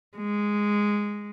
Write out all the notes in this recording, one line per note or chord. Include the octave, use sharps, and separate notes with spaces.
G#3